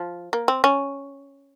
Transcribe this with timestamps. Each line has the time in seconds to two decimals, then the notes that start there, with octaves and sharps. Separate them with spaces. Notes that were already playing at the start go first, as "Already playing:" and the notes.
Already playing: F3
0.33 A#3
0.48 C4
0.64 C#4